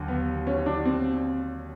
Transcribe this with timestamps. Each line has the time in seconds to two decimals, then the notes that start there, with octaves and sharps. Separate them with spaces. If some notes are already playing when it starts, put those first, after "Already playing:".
Already playing: D#2 D3 F#3
0.08 B3
0.47 C#4
0.66 D4
0.85 C4